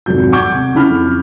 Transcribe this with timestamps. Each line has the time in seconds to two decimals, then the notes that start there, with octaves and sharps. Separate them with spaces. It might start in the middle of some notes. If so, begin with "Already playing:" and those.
0.06 G#1 F2 C3 F#3 G6
0.32 F#5 C#6 D6 G6 G#6
0.54 C3
0.75 C#3 E4 B5 F6
0.89 F2